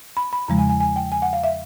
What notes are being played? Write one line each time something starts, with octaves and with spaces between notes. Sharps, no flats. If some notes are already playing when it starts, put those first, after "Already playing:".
B5
B5
E2 C#3 F3 G#3 A#5
G#5
G#5
G#5
G5
G#5
F#5
F5
E5